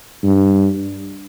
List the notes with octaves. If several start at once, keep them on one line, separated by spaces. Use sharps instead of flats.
G2